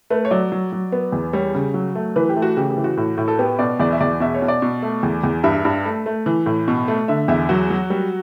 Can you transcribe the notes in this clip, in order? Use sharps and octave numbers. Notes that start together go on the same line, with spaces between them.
A3 B4
C#5
F#3 D5
F#3
F#3
B3
E2
G3 C#5
C#3
F#3
A3
E3 B4
G4
A3
F#4
C#3 G4
G4
E3
F#4
A2
A2
A4
B3 G4
B2 D5
E2 D5
E5
E2 D5
B2 E5
C#5
B2
D5
B2
A3
E2
E2
G2 E5
G2
A3
A3
E3
A2
B2
A3
D3 E5
E2 E5
F#3 F#4
F#3
G3